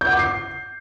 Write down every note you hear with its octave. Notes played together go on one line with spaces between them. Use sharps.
G6
F#5
D6
C7